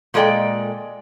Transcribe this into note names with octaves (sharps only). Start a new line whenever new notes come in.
A#2 G#3 A4 D5 D#5 G5